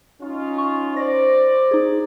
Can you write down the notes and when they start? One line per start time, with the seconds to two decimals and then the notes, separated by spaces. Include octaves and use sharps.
0.21 C#4 D#4 F4
0.58 C#6
0.97 C5 D5 A#6
1.71 D#4 G#4